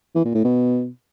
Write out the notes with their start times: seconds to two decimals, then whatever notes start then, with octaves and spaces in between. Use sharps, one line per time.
0.15 E3
0.25 A#2
0.35 A2
0.44 B2